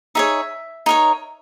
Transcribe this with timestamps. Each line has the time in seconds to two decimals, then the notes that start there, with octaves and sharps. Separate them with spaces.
0.15 D#4 G#4 C#5 E5
0.86 D#4 A#4 C#5